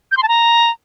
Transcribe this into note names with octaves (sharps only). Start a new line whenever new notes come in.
G6
C6
A5
A#5